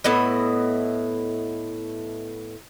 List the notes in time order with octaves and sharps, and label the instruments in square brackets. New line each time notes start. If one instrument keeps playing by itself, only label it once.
[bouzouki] A2 B3 E4 D#5